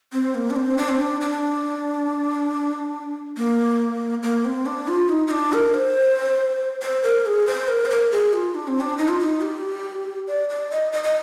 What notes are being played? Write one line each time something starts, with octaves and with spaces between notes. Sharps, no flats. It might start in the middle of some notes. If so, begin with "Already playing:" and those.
C4
A#3
D4
C4
D4
C4
D4
D4
A#3
A#3
C4
D4
F4
D#4
D#4
D4
A#4
C5
C5
A#4
G#4
C5
A#4
C5
A#4
G#4
F4
D4
C4
D4
D#4
F4
D#4
G4
D5
D5
D#5
D#5
D#5